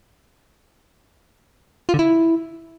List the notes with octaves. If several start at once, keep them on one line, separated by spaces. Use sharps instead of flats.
F4
D3
E4